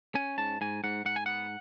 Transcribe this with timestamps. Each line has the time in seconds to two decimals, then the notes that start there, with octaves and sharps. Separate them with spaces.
0.15 C#4 G#5
0.38 G#2 A5
0.61 G#2 G#5
0.84 G#2 F#5
1.05 G#2 F#5
1.16 G#5
1.26 B3 F#5